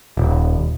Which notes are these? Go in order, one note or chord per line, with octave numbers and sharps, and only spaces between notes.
D#1